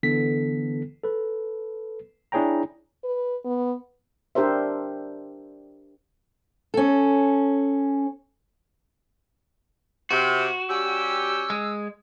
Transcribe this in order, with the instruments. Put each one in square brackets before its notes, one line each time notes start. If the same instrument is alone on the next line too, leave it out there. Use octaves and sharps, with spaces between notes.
[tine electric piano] D3 E3 B3 A4 B6
A4 B4
D4 E4 G#4 C#5 G5 A#5
[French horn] B4
B3
[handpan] D4 G4 A#4 C5 E5
[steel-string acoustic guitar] C#4 A4
[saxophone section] C3 [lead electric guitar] F#4
[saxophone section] G3 C#4 G4 [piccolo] E6
[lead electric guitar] G#3